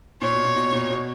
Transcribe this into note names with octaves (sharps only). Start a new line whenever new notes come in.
A#2 C#5
B2
A#2
B2
A#2
B2